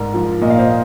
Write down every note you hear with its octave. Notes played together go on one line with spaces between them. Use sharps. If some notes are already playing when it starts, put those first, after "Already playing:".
Already playing: G#2 G#3 A#4 D5
F3
A#2 D#5
F5
C5 D#5